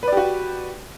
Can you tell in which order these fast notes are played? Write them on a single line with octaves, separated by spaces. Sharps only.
B4 D5 G4 F#4